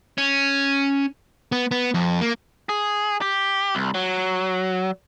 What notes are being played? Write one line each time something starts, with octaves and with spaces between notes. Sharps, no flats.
C#4
B3
B3
F2
A#3
G#4
G4
C2
F#3